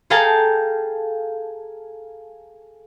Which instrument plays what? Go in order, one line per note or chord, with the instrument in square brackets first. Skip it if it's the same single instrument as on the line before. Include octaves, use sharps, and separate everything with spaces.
[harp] G#4 A4 F5 G5 A5 A#5